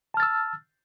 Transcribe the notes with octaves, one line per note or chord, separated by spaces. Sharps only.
A5 E6 F6 A6